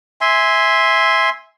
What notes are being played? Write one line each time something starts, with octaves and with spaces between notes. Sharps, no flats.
E5 G#5 C6